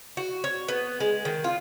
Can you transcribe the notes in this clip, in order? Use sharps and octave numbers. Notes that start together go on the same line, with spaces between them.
F#4
C#5
B3
G#3
D#3
F4